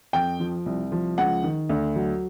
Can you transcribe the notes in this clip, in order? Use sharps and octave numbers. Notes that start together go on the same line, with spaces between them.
F2 G5
F3
C2
F3
C#2 F#5
D#3
D2
F#3